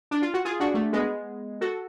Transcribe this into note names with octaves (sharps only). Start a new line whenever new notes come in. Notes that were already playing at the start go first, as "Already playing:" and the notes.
D4
F4
F#4
F4 G#4
D4 F#4
A3
G#3 B3
F#4 A4